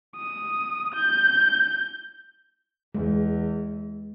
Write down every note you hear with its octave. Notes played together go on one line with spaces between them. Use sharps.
D#6
G6
E2 G#3